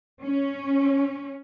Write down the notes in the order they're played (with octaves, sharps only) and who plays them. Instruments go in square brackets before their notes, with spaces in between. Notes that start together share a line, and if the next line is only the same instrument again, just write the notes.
[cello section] C#4